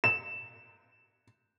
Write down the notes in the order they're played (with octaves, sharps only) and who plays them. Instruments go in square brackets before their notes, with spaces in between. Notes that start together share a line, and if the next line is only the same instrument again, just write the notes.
[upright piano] E7